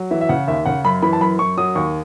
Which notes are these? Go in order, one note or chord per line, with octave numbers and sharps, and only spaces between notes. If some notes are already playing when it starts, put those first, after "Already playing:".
Already playing: F#3
E3 E5
E5
C#3 F#5
D#2 E5
C#3 F#5
F#2 B5
E3 B5
A5
F#2 B5
F#2 C#6
F#3 D#6
D#2 C#6